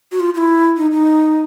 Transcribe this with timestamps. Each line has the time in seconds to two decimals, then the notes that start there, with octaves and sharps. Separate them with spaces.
0.12 F#4
0.20 F4
0.34 F4
0.37 E4
0.77 D#4
0.91 D#4